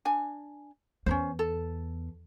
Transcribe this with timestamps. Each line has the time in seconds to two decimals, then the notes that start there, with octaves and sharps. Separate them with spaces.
0.05 D4 G#5
1.06 E2 C#4 D#4 C5
1.39 A4